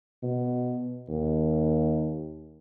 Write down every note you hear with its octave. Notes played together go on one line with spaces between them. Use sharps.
B2
D#2